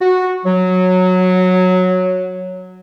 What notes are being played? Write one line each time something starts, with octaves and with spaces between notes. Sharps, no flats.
F#4
F#3